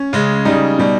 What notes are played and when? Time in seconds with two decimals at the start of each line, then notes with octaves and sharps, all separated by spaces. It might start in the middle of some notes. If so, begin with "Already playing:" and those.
Already playing: C#4
0.13 C#3 G#3
0.45 C#3 G3 D#4
0.78 B2 G3